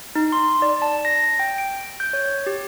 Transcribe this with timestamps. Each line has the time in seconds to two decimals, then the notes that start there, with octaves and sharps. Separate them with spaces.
0.15 D#4
0.32 C6
0.62 D5
0.82 A5
1.05 A#6
1.39 G5
1.58 D7
2.00 G6
2.13 C#5
2.46 G4